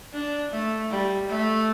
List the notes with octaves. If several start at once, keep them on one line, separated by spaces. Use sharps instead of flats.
D4
A3
G3
A3